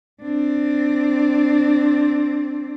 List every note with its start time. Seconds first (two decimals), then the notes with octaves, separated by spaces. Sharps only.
0.22 C4 D4